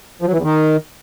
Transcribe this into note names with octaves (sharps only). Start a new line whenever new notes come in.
F3
F#3
E3
E2
D#3